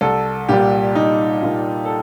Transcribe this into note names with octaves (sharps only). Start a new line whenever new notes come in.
C2 A4
A#2 G3 G4
C2 D#4
A#2 G3 F4
A4